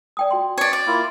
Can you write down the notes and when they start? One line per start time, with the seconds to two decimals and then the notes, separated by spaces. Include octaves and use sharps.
0.17 D5 G5 D#6
0.31 F#4 G5 C6
0.58 C#5 D5
0.73 D5
0.87 A#3 E4 F4